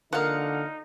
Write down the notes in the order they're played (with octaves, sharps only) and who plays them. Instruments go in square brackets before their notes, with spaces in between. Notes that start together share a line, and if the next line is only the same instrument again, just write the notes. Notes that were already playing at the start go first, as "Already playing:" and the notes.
[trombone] D3 [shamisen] F3 A#3 [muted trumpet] D#4 [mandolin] F5 F#5